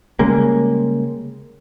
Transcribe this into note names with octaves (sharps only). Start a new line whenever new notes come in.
C#3 G3 G#3 A#3